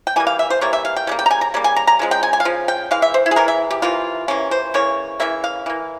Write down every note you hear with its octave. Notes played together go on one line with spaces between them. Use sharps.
G5
E3 G3 A#3 G#5
F5
E5
C5
E3 G3 A#3 C#5
E5
F5
G5
C#3 G3 A#3
G5
A#5
G#5
A#5
C#3 G3 A#3
G#5
A#5
A#5
C#3 F3 G#3
G5
G#5
G#5
F5
C#3 F3
G5
E3 G#3 F5
E5
C5
E4
G#4
E3 G#3 A#4
E5
G4
C3 E3 A#3 F4
C3 E3 A#3 C#4
C5
C#3 E3 A#3 C#5
C#3 E3 A#3 E5
F5
E3 A#3